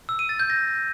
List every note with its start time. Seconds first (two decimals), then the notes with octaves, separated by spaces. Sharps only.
0.09 E6
0.19 D#7
0.29 A6
0.39 G6
0.50 A#6